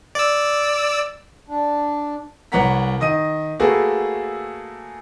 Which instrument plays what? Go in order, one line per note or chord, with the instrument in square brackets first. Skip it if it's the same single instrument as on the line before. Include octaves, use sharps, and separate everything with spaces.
[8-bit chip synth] D5 E6
[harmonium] D4
[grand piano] C2 B4 C#5 F#5 A#5 B6
D#3 D#5 D#6 D#7
A3 A#3 F#4 G#4 A4 B4